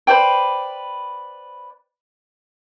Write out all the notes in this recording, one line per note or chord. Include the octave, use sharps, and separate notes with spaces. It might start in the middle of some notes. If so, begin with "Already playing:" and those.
B4 C5 D5 G5